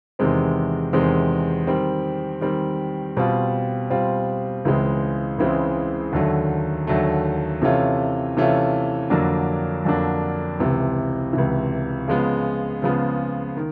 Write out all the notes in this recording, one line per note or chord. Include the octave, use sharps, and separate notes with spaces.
E2 C3 D#3 G#3 C4
E2 C3 D#3 G#3 C4
D#3 G3 C4
D#3 G3 C4
B2 G3 C4 F4
B2 G3 C4 F4
C#2 C#3 E3 G#3 C4
C#2 C#3 E3 G#3 C4
D#2 D3 F#3 A3
D#2 D3 F#3 A3
C3 E3 A3 C#4 F4
C3 E3 A3 C#4 F4
F2 D3 F#3 A#3 D4
F2 D3 F#3 A#3 D4
C#2 C3 E3
C#2 C3 E3
C#3 F3 G#3 B3
C#3 F3 G#3 B3
D#3